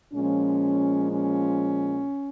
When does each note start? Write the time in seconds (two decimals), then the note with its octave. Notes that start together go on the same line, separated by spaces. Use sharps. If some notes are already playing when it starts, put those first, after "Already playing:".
0.14 A#2 F3 G#3 C#4
1.11 C#4